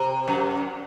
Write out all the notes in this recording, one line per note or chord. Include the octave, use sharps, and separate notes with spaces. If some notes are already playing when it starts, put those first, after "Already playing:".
Already playing: C3
F#2